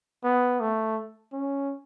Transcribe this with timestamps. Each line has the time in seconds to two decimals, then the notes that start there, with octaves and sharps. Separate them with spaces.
0.24 B3
0.60 A3
1.33 C#4